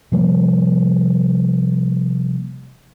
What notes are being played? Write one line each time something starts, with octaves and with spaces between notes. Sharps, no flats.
C3 F3 G3 A#3